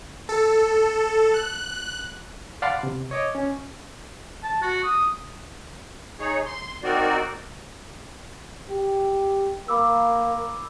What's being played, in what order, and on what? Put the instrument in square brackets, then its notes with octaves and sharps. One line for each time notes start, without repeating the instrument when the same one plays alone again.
[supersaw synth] A4
F#6
[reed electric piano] D5 F5 F#5 A5 B5 C6
C3
C#5 D#5 D6
C#4
[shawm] A5
F#4
D#6
[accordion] D#4 G#4 C#5
C6
C4 D#4 F#4 A#4 D5
[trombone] G4
[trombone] A#3 [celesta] B5 D6 E6